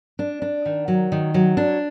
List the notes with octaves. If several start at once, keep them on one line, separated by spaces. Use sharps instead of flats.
D4
D4
D#3
F#3
D#3
F#3
D4